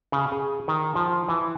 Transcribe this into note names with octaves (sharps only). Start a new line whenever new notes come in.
C#3
G#4
D#3
F3
E3